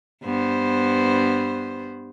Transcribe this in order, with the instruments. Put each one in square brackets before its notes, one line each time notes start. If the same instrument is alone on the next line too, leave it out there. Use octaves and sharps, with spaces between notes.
[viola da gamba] G2 B3 C5